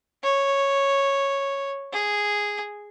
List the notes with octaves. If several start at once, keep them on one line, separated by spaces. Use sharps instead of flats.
C#5
G#4